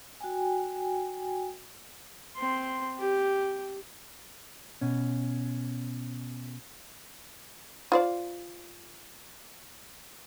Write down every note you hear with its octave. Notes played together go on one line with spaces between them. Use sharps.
F#4 G5 G#5
C4 C6
G4
B2 C#4
F4 C5 D5